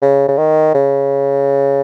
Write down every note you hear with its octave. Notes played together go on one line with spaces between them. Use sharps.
C#3
C#3
D#3
C#3